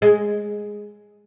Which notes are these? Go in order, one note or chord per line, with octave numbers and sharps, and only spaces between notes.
G#3